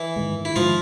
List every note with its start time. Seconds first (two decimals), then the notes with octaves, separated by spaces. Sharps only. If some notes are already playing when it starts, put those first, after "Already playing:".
Already playing: E3 E4
0.16 G#2 D#3 G#3
0.45 E4
0.56 G#2 D#3 F3 G#3 F4